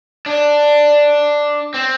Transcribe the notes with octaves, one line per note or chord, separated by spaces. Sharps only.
D4
C4